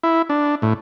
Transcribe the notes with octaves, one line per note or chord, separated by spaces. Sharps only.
E4
D4
A2